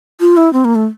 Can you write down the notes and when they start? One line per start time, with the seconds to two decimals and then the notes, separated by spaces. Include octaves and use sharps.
0.20 F4
0.37 E4
0.53 C4
0.65 A#3
0.75 A3